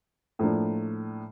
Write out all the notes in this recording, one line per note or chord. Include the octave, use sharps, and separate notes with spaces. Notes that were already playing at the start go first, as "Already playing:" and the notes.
A2 F3 A#3 D4